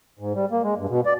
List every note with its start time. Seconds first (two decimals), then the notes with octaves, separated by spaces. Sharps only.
0.19 G#2
0.35 G3
0.51 A#3
0.63 G#3
0.77 G2
0.89 B2
1.06 D5